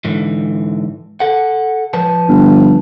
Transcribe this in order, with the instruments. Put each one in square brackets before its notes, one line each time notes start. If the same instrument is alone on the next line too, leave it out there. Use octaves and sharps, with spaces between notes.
[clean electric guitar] G#2 D3 E3
A4 F#5
F3 B4 A5
[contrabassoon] G1